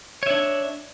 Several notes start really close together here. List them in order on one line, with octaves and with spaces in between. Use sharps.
C#5 E5 D4